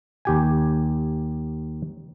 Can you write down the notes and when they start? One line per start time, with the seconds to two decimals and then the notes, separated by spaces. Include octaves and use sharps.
0.25 D#2 G4 G#5